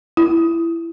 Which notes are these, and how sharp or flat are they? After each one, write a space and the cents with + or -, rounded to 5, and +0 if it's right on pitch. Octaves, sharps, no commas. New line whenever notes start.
E4 +20